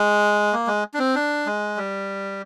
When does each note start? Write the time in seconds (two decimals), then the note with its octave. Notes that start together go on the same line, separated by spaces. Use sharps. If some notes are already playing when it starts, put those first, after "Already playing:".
Already playing: G#3
0.53 A#3
0.67 G#3
0.94 D4
0.99 C4
1.15 D4
1.46 G#3
1.77 G3